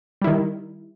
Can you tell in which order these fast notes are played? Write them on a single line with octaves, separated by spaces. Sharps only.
G3 E4 D#3